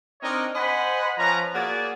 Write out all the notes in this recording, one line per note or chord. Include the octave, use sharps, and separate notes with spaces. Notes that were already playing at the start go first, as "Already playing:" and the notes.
C4 D4 D#4 A#4 C#5 D#5
C5 D#5 F#5 G#5 B5
F3 C#4 B4 A#5
A#3 F#4 G#4 D5